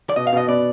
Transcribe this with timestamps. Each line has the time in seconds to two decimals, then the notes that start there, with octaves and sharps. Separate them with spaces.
0.10 D5
0.16 B2 D#5
0.27 F5
0.33 B2 D#5
0.48 B3 D5